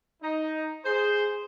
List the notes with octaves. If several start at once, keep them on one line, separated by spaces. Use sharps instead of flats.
D#4
G#4 C5